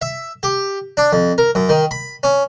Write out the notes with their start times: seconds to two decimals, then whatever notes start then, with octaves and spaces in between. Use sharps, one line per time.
0.02 E5
0.43 G4
0.97 D4
1.12 F2
1.38 A#4
1.55 F#2
1.69 D#3
1.91 B5
2.23 C#4